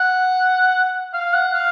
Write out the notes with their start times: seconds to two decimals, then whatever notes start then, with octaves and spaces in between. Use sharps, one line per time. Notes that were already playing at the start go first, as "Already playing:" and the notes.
Already playing: F#5
1.14 F5
1.34 F#5
1.54 F5